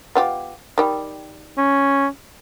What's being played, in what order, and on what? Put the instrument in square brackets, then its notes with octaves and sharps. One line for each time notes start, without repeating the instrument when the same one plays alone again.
[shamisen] B3 F4 G4
D#3 G3
[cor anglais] C#4